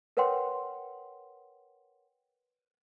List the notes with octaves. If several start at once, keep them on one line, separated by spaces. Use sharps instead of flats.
A#4 B4 C#5 F#5 G5 C6